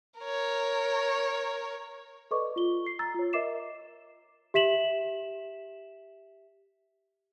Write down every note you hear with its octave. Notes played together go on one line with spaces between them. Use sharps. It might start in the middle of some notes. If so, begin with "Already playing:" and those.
A#4 C#5
A4 B4 D5 D#5 C#6 D6
F4 G7
C7
A#5 E6 A6
F4 C#5
A#4 D#5 E5 D6 C7 E7
G4 E5 B6 E7 F#7